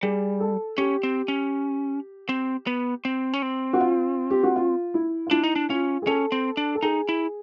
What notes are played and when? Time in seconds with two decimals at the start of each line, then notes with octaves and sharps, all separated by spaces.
0.03 G3 G#4
0.40 A4
0.78 C#4 G4
1.03 C4
1.28 C#4
2.29 C4
2.67 B3
3.05 C4
3.33 C#4
3.42 C4
3.73 F#4
3.80 F4
4.30 G4
4.43 F#4
4.56 F4
4.94 E4
5.27 F4
5.31 D4 E4
5.44 D#4
5.56 D4
5.70 C#4 F4
6.02 G#4
6.07 C#4 A4
6.32 C4
6.57 D4
6.75 A4
6.83 D#4 G#4
7.09 E4